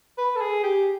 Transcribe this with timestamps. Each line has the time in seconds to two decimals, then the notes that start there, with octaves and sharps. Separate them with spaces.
0.18 B4
0.36 A4
0.41 G#4
0.63 G4